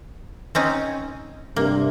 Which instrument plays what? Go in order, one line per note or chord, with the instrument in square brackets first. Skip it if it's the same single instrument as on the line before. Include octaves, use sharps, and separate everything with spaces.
[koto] C4 C#4 D#4
[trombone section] G2 C3 [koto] A#3